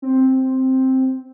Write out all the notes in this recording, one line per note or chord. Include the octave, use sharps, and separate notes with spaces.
C4